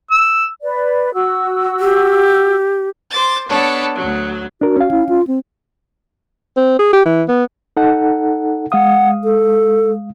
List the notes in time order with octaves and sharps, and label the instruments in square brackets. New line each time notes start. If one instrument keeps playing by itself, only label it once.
[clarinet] E6
[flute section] B4 D5
F#4 E6
[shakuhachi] G4
[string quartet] C5 D6 A6
B3 D4 A4 C#5
D2 F#3
[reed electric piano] D4 A#4 [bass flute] F#4
[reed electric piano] C#4 F5
[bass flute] E4
F4
C4
[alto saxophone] C4
G#4
G4
E3
B3
[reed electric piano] D#4 A4 F#5
[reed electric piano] G#3 F5 D#6 [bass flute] F#5
[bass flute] A4